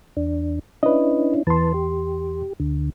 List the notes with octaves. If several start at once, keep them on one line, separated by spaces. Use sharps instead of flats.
E2 D4
C#4 D4 E4 B4 D#5
E2 E3 B4 A5 C6
G4
D2 D3